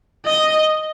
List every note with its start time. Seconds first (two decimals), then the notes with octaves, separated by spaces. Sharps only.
0.25 D#5